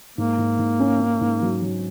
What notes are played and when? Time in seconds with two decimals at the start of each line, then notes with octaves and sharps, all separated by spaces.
0.18 G#2 A#3
0.38 G#2
0.59 G#2
0.80 C#4
1.00 C#4
1.21 G#2
1.42 F#3
1.62 F#3